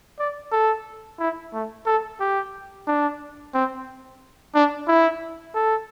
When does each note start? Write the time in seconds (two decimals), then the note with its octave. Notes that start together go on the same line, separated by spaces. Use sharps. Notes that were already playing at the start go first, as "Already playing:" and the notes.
0.19 D5
0.52 A4
1.19 E4
1.53 A3
1.86 A4
2.20 G4
2.87 D4
3.54 C4
4.54 D4
4.88 E4
5.55 A4